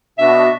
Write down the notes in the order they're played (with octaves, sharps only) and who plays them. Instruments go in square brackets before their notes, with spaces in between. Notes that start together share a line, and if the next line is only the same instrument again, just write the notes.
[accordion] B2 B3 D4 F#4 [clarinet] E5